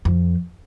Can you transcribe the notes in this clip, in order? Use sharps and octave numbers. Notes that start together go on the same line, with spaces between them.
F2